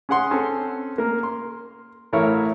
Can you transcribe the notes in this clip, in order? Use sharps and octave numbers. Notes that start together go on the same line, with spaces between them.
C#4 G#4 F#5 C6
C4 C#4 A4
A#3 A#4
C6
A1 A2 E4 A#4 C#5